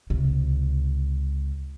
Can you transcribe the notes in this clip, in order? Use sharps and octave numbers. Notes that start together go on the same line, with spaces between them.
C#2 C3